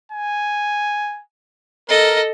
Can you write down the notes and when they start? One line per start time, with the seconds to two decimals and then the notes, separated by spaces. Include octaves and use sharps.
0.12 G#5
1.89 A4 A#4 D#5